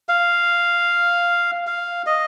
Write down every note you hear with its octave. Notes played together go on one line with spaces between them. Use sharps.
F5
F5
D#5